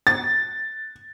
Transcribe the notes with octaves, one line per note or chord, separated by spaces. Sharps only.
A6